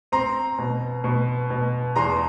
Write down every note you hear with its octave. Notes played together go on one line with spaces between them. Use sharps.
C4 A#5 C6
B2
B2
B2
E2 A#5 C6